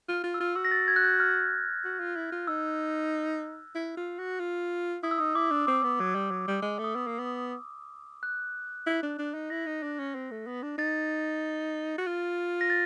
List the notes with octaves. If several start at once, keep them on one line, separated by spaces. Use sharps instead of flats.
F4
F6
F4
E6
F4
F#4 E6
A#6
A6
G#6
F#6
G6
F6
F#4
F4
E4
F4
D#4 E6
E4
F4
F#4
F4
E4 D#6
E6
D#4 D#6
E4 D6
D4
C4 D6
B3
F#3
G3
F#3
G3
G#3
A3
D#6
B3 E6
A#3
B3
F#6
E4
D4
D4
D#4
E4 A#6
D#4
D4
C#4
C4
A3
B3
D4
D#4 A6
F#4
F4
A#6
A6